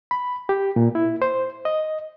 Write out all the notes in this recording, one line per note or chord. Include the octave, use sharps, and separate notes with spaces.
B5
G4
A#2
E4
C5
D#5